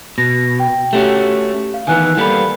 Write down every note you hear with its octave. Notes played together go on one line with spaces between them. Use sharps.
B2 A#6
G5
A3 C#4 F#4 G4
F5
D#3 E3 B3 G#5 F#6
G3 A#3 B3 A4 B5